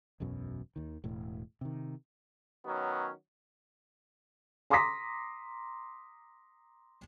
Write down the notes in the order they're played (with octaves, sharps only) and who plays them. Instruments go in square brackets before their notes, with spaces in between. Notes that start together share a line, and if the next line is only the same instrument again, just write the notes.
[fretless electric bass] E1 B1 F#2 B2
D#2 D#3
E1 A2
C3 D#3
[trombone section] D#3 F#3 B3 C#4
[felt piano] A#5 C6 D6 D#6 A#6 B6